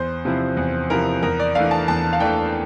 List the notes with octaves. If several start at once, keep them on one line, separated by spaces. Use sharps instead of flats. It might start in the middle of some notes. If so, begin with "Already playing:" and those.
Already playing: E2 C5
C3 F3 C4 E4
E2
C3 F3 C4 E4 A#4
E2 A#4
D5
E3 A3 D4 F5
A5
E2 A5
F5
E3 A3 D4 G5